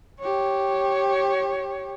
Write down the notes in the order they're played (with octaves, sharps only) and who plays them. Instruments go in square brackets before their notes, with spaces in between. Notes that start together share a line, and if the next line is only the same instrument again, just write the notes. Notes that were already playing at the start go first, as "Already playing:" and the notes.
[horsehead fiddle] G4 C#5